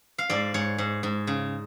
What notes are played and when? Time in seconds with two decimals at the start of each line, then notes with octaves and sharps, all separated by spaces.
0.18 F5
0.30 G#2 D5
0.54 G#2 C#5
0.78 G#2
1.03 G#2
1.27 C#3